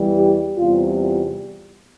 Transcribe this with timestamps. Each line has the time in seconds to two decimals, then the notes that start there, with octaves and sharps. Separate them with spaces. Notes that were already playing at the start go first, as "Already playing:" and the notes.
Already playing: E2 E3 G3
0.16 G4
0.58 E2 C3 G3 F4
0.99 F4